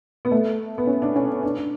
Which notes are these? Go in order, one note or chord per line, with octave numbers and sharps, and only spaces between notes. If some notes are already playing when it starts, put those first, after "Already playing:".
B3
A3
B3
C#4
D4
C#4
D4
D4